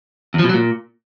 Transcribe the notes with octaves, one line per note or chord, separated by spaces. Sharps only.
E2
F3
B2
F#3
A#2